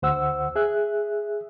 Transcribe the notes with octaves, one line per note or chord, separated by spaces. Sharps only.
D2 C5 F#5 E6
G#4 E5 F#6